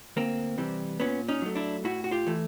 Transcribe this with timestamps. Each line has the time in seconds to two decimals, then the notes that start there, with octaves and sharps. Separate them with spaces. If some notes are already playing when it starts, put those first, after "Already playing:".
0.17 D2 A#3 C4
0.58 C3 E3 G3
1.00 A#2 B3 C#4
1.28 C#4 D#4
1.42 F#3 A3
1.55 D4 E4
1.84 A2 E4 F#4
2.04 F#4
2.11 F4 G4
2.27 E3 A3